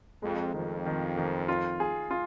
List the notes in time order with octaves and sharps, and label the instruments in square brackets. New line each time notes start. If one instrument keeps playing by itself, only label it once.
[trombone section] F2 [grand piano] G#3
[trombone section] F2 [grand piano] D#3
[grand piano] D#3
D#3
F4
G#4
F4